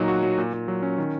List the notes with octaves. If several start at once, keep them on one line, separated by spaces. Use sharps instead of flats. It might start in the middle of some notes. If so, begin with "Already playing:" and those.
Already playing: A#2 F#3 D#4
F#4
F#3
A#2
A#2
F#3
C#4
D#3